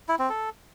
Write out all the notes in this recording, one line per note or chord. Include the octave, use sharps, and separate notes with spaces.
E4
C4
A4